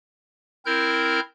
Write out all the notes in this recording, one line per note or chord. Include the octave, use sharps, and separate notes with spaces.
C4 E4 A#4 F6 G6